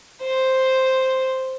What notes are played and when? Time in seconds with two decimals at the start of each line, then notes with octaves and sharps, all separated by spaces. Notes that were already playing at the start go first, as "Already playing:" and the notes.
0.22 C5